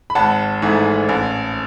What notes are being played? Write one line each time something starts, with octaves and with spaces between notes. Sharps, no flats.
B5
G#1 F#5 A5
G#2 E3 A3
A1